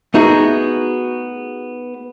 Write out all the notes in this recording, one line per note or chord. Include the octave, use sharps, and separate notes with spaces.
A3 B3 D#4 F#4 G#4